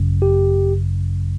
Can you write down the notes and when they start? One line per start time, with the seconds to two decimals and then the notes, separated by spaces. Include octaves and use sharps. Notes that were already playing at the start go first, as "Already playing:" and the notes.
Already playing: G#1 F#2 C#3
0.22 G4